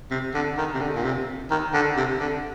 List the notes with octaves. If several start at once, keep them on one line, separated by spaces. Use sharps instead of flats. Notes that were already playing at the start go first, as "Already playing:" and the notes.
C3
D3
D#3
C3
D3
A#2
C3
D#3
D3
C3
D3